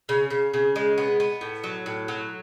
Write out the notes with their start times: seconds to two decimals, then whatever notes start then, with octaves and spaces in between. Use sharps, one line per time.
0.09 C#3
0.31 C#3
0.54 C#3
0.76 G#3
0.98 B3
1.20 B3
1.41 A2
1.64 F#3
1.86 A2
2.08 F#3